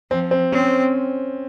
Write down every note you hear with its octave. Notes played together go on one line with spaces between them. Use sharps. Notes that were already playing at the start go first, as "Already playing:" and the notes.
F3 C4
C4
C4 C#4